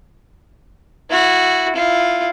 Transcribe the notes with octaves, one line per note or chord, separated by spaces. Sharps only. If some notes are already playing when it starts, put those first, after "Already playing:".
E4 F#4
E4 F4